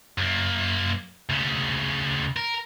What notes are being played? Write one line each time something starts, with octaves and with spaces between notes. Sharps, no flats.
F#2 A#3
D2 C#3
A#4